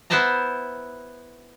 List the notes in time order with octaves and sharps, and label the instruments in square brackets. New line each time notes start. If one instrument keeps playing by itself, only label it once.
[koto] B3 E4 C5 E5 A5 A#5